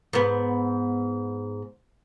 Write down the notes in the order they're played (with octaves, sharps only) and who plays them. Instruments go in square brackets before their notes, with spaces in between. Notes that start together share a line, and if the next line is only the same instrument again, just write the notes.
[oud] G#2 B3